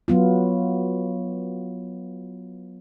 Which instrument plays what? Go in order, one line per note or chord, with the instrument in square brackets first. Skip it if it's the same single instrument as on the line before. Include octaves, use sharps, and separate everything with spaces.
[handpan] F#3 B3 F4